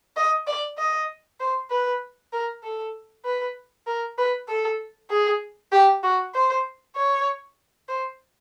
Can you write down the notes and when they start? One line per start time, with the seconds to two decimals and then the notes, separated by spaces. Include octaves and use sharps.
0.17 D#5
0.47 D5
0.78 D#5
1.40 C5
1.70 B4
2.33 A#4
2.63 A4
3.25 B4
3.87 A#4
4.18 B4
4.49 A4
5.10 G#4
5.72 G4
6.03 F#4
6.34 C5
6.96 C#5
7.88 C5